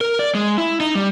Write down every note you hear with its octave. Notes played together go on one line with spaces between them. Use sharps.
A#4
D5
G#3
E4
D#4
G3